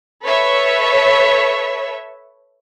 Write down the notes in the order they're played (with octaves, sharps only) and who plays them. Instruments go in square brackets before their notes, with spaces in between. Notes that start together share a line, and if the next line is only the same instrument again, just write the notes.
[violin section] A4 B4 C#5 E5